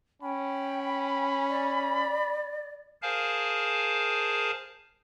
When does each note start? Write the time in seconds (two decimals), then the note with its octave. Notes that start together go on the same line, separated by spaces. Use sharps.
0.22 C#4 G5 B5
1.49 D5
3.02 G#4 A#4 C5 F5 G#5 A5